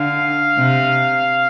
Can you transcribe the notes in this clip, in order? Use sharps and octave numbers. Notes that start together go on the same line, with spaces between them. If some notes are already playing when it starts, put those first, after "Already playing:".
Already playing: D3 F5
C3